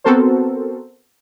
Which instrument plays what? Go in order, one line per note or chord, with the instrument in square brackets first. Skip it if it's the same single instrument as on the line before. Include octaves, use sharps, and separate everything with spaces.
[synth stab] B3 C4 F#4 A4 A#4 C5